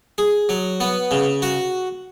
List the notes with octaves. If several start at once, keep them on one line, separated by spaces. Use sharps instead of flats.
G#4
F#3
B3
C#3
F#4